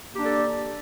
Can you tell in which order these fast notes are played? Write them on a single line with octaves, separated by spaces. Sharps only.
A#3 G4 D4 D5 A4